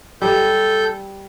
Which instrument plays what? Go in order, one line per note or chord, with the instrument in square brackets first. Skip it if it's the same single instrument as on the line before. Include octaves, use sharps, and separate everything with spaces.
[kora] G3 [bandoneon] A4 G6